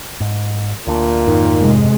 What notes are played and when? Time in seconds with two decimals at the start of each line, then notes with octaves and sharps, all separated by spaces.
0.20 G#2
0.87 D2 A#2 D4
1.27 F2 G#2 D#3
1.58 C3 G#3